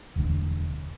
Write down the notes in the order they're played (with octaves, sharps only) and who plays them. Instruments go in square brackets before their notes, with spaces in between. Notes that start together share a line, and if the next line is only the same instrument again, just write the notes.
[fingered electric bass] E1 D2